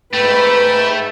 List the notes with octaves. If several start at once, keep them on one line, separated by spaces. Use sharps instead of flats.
G#2 A3 B4 G5 B5